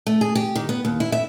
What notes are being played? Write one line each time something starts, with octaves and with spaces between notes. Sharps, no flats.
A3
G#4
G4
D#3
B3
D#2
E4
E5